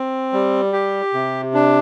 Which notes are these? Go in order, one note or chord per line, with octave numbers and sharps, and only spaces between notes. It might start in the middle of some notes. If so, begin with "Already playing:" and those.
Already playing: C4
G3
G4
C3
D4